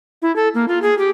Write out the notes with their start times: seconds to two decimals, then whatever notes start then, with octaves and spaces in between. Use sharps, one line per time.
0.22 E4
0.36 A4
0.54 A#3
0.68 F4
0.82 G#4
0.99 G4